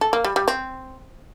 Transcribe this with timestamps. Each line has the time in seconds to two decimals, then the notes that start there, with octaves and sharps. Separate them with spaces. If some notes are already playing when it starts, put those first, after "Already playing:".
0.01 A4
0.13 A#3
0.24 G3
0.36 G3
0.48 C4